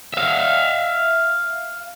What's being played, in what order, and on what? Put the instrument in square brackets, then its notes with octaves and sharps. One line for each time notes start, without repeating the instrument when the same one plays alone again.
[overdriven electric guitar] E5 F5